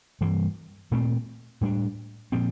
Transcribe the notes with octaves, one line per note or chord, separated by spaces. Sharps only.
G2 E3 G3 A#3
A#2 A3 C4
A2 G3 A#3 D4
A#2 F3 C4